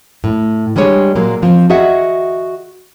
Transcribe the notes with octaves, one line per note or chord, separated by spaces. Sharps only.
A2
G3 G#3 D4 G#4 C#5
A#2 F#3 G#3 A#3
F3 C4
F#4 G#4 D#5 E5 F#5